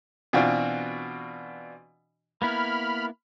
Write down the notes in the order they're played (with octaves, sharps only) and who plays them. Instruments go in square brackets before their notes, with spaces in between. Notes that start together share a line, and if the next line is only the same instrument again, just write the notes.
[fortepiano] B2 E3 C4 D4 F4 F#4
[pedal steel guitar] A#3 B3 E4 [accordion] B5 F6